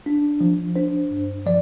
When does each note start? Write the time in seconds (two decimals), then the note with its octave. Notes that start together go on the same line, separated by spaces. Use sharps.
0.06 D4
0.41 F3
0.76 D4 C5
1.11 G2
1.46 F3 D5